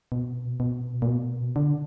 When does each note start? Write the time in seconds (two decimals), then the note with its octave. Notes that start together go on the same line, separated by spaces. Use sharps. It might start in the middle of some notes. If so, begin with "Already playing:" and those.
0.12 B2
0.60 B2
1.02 A#2
1.07 B2
1.56 D3